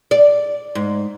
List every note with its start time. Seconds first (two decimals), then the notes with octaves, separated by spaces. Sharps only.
0.11 D5
0.75 G#2